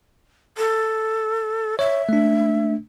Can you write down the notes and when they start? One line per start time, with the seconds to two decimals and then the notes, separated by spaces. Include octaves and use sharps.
0.58 A4
1.79 C#5 E5
2.09 A3 D4